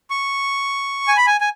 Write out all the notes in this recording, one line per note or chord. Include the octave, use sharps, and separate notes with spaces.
C#6
G#5
B5
G#5
G#5